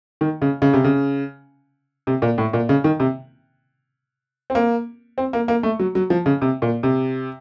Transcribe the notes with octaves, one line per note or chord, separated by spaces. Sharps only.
D#3
C#3
C#3
C3
C#3
C3
A#2
A2
A#2
C#3
D#3
C3
C4
A#3
C4
A#3
A#3
A3
F#3
F#3
F3
C#3
C3
A#2
C3